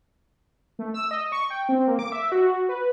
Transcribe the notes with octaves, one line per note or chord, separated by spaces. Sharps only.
A3
E6
D#5
C#6
G5
C4
A#3
D6
E5
F#4
B4